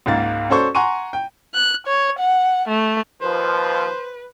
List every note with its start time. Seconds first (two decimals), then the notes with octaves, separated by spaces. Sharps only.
0.06 C#2 G#2 A#3 A6
0.50 C#4 F#4 A4 C5 D5 C#6
0.75 F#5 G#5 A#5 C6 C#6 D#7
1.13 G5
1.54 F#6
1.86 C#5
2.20 F#5
2.68 A3
3.21 D#2 F3 B4 C5